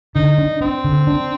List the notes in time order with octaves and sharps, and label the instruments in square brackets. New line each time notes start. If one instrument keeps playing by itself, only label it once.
[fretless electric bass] D3 [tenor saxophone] D#4
[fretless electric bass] D4
[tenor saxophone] C4 [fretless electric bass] D4
[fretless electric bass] D3
D4